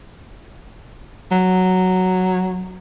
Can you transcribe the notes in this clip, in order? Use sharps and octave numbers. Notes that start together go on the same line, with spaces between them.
F#3